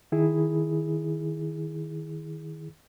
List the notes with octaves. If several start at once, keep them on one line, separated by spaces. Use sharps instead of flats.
D#3 E4 G#4